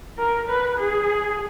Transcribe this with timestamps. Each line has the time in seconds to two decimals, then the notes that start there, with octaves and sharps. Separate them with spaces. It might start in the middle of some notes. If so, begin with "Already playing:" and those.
0.18 A#4
0.48 B4
0.78 G#4